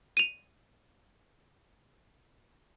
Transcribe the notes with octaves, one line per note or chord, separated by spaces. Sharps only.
D#7 F7